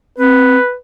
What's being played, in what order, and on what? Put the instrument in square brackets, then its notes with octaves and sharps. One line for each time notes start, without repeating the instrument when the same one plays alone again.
[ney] C4 [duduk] B4